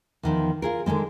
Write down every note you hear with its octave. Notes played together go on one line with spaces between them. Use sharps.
E2 D#3 F3
F4 G#4 A#4
D3 D#3 G#3 C4